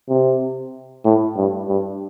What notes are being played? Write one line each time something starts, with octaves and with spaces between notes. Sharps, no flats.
C3
A2
G2
G2